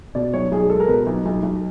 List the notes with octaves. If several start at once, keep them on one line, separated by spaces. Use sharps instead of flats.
B2 D5
B1 C#5
B1 G#4
G#3 A4
A#4
B2 B4
B1
B1
B1